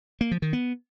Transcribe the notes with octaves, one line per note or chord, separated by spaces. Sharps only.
A#3
F3
D#3
B3